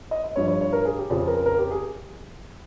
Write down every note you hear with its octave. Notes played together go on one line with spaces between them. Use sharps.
D#5
D#5
G2 F3 C#5
C#5
C#5
A#4
G#4
G4
F2 C#3 F3 G#4
A#4
A#4
G4
G#4